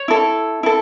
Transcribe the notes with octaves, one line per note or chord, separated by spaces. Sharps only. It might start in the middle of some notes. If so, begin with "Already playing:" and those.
Already playing: C#5
E4 A4
E4 A4